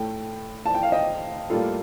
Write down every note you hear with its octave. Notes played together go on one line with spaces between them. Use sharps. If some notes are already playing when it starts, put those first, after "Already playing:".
Already playing: A2 A3 G5
A5
G5
F5
D#5 G5
A2 G3 A#3 F4 A4